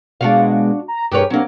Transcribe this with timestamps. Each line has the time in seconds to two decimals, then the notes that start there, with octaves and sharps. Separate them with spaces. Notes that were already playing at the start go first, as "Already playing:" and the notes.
0.21 B2 G#3 D4 F#4 F5
0.88 A#5
1.12 G2 G4 G#4 A#4 B4 C#5
1.30 F#3 A#3 C4 D4 G4